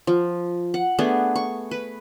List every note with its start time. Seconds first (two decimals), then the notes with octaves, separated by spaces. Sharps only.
0.07 F3
0.74 F#5
0.99 A3 B3 D4 G#4
1.36 C#6
1.71 B4